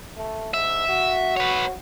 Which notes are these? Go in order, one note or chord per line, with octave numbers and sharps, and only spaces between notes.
A3
G#2 E5
F#4
B4 C#5